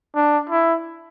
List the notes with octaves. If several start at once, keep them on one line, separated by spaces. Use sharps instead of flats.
D4
E4